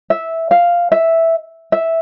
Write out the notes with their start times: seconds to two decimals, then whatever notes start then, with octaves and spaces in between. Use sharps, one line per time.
0.10 E5
0.51 F5
0.92 E5
1.72 E5